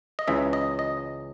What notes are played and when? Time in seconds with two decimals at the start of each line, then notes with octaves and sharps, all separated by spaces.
0.19 D#5
0.28 C#2 C#3 E3 E5
0.53 D#5
0.79 D#5